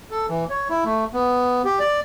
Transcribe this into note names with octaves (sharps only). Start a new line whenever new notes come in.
A4
E3
C#5
E4
A3
B3
G4
D5